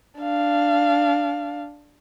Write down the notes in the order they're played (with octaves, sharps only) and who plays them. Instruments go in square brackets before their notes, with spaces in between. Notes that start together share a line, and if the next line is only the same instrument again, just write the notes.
[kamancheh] D4 F5